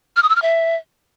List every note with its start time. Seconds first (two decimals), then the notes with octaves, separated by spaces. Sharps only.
0.16 F6
0.23 D#6
0.29 E6
0.36 F6
0.42 E5